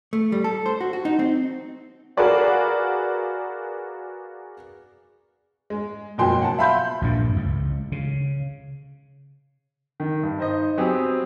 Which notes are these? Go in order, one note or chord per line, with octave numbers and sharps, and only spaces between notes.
A3
G3
A4
C5
F#4
F#4
D#4
C4
F#4 G#4 A#4 B4 D5 F5
G#3
F#1 F2 B2 F#3 G5 C6
F#5 A5
E5 F5 B5 C6 G6
A#1 G2 A#2
C#2
C#3
D#3
G2
D#4 C5 D#5
F#3 B3 C4 G4 G#4